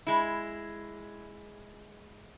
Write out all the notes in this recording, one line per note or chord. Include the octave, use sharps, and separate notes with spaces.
G#3 E4